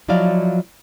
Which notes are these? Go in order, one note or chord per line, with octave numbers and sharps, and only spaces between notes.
F3 F#3 E4 D5 D#5 F5